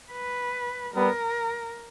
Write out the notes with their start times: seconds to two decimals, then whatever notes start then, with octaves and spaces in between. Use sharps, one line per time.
0.12 B4
0.94 G3 B3 A#4